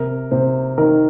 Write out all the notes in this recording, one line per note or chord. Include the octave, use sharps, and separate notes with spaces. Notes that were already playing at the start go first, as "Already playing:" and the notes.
Already playing: C3 A#4
C3 C5
D#3 A#4